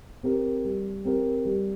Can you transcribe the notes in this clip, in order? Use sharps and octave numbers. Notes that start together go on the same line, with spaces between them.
C4 G4 A#4
G3
C4 G4 A#4
G3